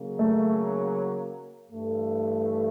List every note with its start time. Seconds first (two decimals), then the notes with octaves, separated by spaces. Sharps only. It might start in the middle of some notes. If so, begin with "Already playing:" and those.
Already playing: C#3 F#3 A#3
0.19 A3
1.70 G2 E3 A3